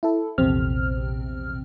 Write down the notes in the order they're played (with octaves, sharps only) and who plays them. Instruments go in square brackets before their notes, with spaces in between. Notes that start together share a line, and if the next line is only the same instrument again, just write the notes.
[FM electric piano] E4 A4
A#1 E2 C3 C4 F6